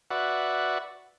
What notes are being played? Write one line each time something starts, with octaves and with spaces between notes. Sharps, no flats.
F#4 B4 D5 E5 F#5